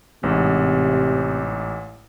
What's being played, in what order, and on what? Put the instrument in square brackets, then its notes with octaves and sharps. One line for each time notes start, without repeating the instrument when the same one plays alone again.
[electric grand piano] A1 G#2 [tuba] C3